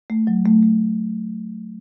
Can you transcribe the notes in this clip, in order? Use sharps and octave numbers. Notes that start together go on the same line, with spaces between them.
A3
F#3
A3
A3